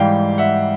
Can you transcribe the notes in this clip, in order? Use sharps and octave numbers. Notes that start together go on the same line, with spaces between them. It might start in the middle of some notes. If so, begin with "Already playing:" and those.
Already playing: G#2 E3 G3 F5 G5
E5 F#5